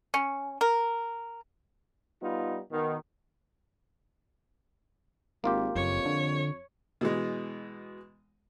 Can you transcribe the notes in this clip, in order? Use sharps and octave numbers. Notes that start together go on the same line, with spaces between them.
C#4
A#4
G3 B3 D#4 F4
B2 D#3
G#1 A#3 F4 G4
F#1 F2 C#5
D3
B2 E3 G#3